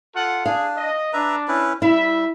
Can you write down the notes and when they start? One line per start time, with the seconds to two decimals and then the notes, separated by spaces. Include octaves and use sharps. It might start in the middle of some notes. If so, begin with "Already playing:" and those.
0.15 F4 A4 F#5
0.46 D4 G#4 F5
0.76 D#5
1.13 D4 B4 E5 A#5
1.48 C#4 E4 B4
1.82 G3 E4 E5